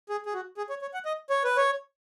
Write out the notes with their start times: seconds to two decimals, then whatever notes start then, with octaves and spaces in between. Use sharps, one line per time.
0.09 G#4
0.26 G#4
0.34 F#4
0.57 G#4
0.70 C#5
0.82 C#5
0.94 F#5
1.05 D#5
1.30 C#5
1.44 B4
1.57 C#5